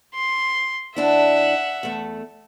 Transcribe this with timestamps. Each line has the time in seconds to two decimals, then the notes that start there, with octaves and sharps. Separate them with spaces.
0.15 C6
0.96 D2 D4 E4 E5 F#5
1.83 E2 A3